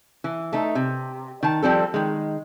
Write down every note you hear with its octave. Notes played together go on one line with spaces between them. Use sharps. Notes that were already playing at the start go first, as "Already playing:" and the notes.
E3
A3 D#4
C3
D#3 A5
F3 G3 C4 A4
D#3 G#3